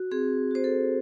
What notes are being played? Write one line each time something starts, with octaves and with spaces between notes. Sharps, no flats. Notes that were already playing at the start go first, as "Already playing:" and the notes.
Already playing: F#4
C4 G#4
F#4 C5
A4